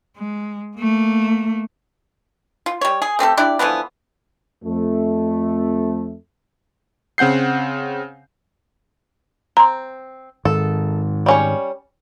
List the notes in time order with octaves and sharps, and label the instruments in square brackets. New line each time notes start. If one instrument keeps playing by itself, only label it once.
[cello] G#3
A3 A#3
[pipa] F4
G3 C#5
G#4
A3 C4 G4 A4
D4 E4 G4 D5
D3 E3 F3 B3
[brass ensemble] F2 A3
[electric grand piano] C#3 C4 F#5 G6 C7
[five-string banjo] C4 [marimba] A#5 C6
[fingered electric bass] G#2 D#3 [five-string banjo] A4
[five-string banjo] G3 C#4 C#5